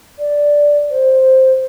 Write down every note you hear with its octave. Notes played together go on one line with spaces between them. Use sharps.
D5
C5